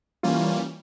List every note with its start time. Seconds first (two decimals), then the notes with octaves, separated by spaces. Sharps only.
0.23 E3 G3 A#3 C#4 F4